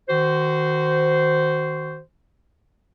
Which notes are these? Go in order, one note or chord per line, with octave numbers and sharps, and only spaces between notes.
D#3 F#4 C5